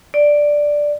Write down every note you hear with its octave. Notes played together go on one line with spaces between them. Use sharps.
D5